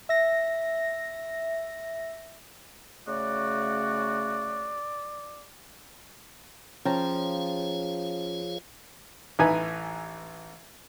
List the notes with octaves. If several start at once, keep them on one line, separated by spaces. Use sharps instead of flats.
E5 A#6
C#3 A3 F#4 D5
F3 C#4 G#4 C#5 F5 G5 A#5
A1 E3 D#4 B4 G#5